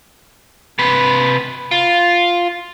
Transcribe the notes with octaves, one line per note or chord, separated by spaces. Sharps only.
C3 B4
F4